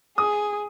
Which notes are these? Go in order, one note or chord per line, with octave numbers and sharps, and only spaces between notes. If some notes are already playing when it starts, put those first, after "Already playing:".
G#4 D#6